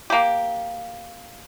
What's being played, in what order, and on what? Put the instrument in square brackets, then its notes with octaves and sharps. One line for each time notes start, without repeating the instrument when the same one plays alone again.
[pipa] A#3 G4